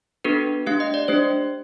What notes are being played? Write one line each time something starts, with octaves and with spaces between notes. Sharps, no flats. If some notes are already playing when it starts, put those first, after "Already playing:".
B3 D4 F#4 A4 B4
A3 D4 G4 F5
D#5
D5
A3 D4 G4 C5